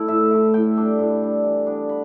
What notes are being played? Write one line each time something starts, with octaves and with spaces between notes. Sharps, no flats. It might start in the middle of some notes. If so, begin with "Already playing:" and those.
Already playing: A3 E4
A2 E5
A3 E4
A2 G5
G3 D4
A2
G3 D4
E3
B3 D4
B5